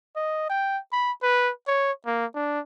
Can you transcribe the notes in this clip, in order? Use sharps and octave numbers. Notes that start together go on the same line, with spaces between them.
D#5
G5
B5
B4
C#5
A#3
D4